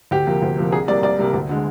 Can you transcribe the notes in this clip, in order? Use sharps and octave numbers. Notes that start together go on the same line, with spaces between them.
D2 G4
C3 F3 A#3
D2
C3 F3 A#3
C2 G#4
C3 G3 A#3 D5
C2 D5
C3 G3 A#3
D2
D3 G#3